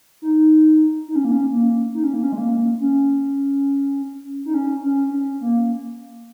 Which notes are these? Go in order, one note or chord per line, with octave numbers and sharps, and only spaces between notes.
D#4
D#4
C#4
A#3
C#4
A#3
D#4
C#4
A#3
C#4
G#3
A#3
C#4
D#4
C#4
C#4
C#4
A#3